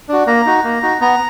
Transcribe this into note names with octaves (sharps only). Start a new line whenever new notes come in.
D4 F#4
A#3 A#5
D#4 F#4
A#3
D#4 F#4
B3 A#5